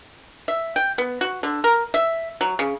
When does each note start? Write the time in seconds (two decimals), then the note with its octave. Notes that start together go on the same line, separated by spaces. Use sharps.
0.48 E5
0.76 G5
0.98 B3
1.21 F#4
1.43 D3
1.64 A#4
1.94 E5
2.41 F#3
2.59 C#3